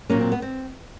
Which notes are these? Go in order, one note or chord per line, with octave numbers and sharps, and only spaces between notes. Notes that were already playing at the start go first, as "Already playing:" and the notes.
A#2 F#3 A#3 C#4
C4
B3
C4